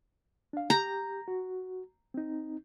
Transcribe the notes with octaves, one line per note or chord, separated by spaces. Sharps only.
D4 F5
G4 A#5 G6
F#4
C4 D#4